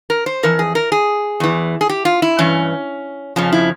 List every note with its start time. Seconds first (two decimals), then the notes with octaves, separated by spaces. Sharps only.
0.10 A#4
0.26 C5
0.43 F2 E3 A#4
0.59 G#4
0.75 A#4
0.92 G#4
1.40 E2 E3
1.81 G#4
1.89 G4
2.05 F4
2.22 E4
2.39 G2 E3 C#4
3.36 F2 C#3 F3 C#4
3.52 E4